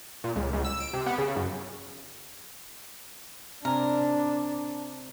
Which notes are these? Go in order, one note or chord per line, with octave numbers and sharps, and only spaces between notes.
A#2
C#2
C#2
E6
D7
C3
B3
C#3
F#2
C3 D4 A#4 G#5